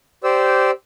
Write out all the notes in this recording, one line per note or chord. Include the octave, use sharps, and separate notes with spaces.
G4 C5 D5 E6